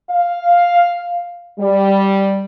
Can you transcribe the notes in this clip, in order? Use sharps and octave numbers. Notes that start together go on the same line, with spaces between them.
F5
G3